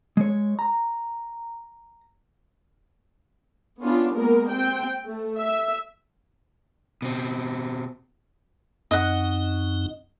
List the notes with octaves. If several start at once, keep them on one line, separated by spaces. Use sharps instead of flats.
G#3 C#5
A#5
B3 C#4 D4 F4
G#3 A#3 B3 A#4
C4 G5
A3
E5
B2 C4
F#2 C4 D#4 D#5 F#5